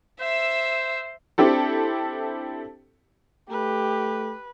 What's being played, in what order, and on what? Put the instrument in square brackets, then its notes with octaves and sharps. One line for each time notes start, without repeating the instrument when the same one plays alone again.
[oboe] C5 [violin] E5 E6
[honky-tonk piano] C4 D4 E4 G4 A4
[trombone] A3 [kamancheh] G4 [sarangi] B4